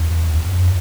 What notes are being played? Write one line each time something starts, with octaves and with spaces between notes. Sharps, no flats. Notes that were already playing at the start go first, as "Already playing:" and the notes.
Already playing: E2
E2
F#2